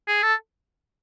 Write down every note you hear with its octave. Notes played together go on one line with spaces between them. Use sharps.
G#4
A4